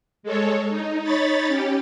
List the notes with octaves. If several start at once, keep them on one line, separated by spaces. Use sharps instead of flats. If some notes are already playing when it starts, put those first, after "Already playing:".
G#3 A4 C#5
D#4
D#4 C#5 B5 A6
C#4 G4